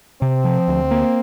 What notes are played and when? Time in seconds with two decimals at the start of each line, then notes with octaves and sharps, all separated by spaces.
0.21 C3 C4
0.44 F3
0.68 D2
0.91 A#3